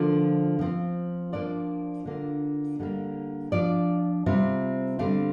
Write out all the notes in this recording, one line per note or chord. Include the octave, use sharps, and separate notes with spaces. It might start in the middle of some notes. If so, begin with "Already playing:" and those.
Already playing: D3 F3 A#3 F4
F3 C4 F4
F3 A#3 D4 F4 D5
D3 A#3 D4 F4
D3 G3 A#3
F3 D4 F4 D5
C3 G3 C4 F4
D3 G3 C4 F5